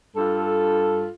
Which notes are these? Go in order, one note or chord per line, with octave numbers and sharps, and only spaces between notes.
G2 F4 A4